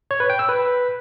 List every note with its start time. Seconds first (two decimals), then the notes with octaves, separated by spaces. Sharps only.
0.11 C#5
0.20 B4
0.30 G5
0.39 E6
0.49 B4